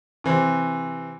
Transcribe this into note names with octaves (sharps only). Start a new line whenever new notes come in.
C3 E3 C4